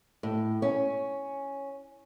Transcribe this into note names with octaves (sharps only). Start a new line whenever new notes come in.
A2
C#4